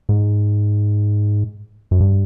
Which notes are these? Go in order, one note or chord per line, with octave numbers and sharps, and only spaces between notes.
G#2
F#2
G2